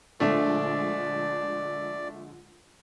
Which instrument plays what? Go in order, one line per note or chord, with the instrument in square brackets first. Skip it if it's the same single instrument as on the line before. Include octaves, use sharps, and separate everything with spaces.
[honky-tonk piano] A#1 D3 G#3 [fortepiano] A3 D4 [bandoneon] D5